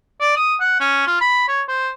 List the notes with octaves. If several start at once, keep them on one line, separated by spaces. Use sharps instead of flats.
D5
D#6
F#5
C#4
F4
B5
C#5
C5